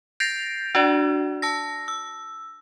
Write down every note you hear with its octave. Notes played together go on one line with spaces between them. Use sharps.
G6 A6 A#6 C7 D7 F7
D4 F#4 D5
A5 E6 A#6
E6